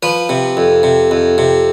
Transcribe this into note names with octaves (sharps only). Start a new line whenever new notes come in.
F3 B4
C3
F2
C3
F2
C3